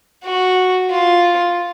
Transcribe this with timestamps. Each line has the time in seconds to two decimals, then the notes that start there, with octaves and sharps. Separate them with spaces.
0.24 F#4
0.90 F4